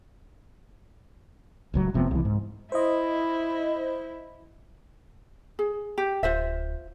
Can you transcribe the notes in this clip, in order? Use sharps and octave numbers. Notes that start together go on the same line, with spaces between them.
D1 C#2 F#3
F1 C3 F3 B3
C2 E3
G#2
E4 C5 D#5
G#4
G4
D1 F4 C5 E5